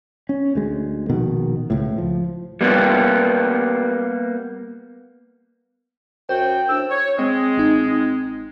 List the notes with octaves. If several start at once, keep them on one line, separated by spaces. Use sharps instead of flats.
C#4
D2 G#3
A#1 B2 D#3
C#2 A2
F3
G3 A#3 B3
F#2 F#4 C5 G5
A2 D4 E6
C#5
G#3 C4
A1 D#4